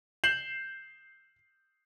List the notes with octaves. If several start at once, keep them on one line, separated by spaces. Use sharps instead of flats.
G6 C7 E7 F#7